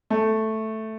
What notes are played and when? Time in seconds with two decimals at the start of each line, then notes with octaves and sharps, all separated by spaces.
0.10 A3